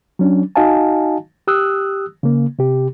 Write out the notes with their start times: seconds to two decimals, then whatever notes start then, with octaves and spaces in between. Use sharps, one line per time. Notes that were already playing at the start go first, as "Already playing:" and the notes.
0.19 F#3 C#4 D4
0.56 D#4 F#4 D#5 F5 G#5 A5
1.47 G4 D#6 E6 F#6
2.23 C#3 A#3
2.59 C3 G4